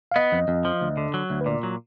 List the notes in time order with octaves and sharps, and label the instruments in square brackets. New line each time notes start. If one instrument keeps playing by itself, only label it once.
[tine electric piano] F5
[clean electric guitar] B3 [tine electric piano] D#5
[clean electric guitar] F2
F2
F3
D2
D3
F#3
D2
[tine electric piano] B4
[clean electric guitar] A#2 [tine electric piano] D5
[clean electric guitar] F#3